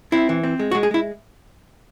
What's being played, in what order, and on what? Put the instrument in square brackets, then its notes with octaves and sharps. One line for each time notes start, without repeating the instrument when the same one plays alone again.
[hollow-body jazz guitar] C4 E4
E3
C4
G#3
F#4
G#3
G#4
G#3 E4